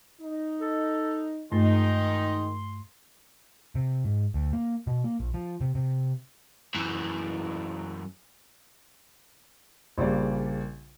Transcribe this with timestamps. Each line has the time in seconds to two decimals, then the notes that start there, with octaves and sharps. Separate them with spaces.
0.21 D#4
0.60 A4
1.52 G2 D#3 G#3 A3 D#4 C6
3.75 C3
4.04 G#2
4.34 D2
4.53 A#3
4.87 B2
5.04 A#3
5.20 A#1
5.34 F3
5.61 C3
5.75 C3
6.75 F#2 E3
9.98 A#1 C#3 G3 A#3 D5